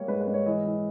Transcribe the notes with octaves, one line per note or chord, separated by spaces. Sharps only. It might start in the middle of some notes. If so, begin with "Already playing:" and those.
Already playing: G3 A#3 C#5
G#2 B4
B4
G#2
C#5
E3 D#5
E3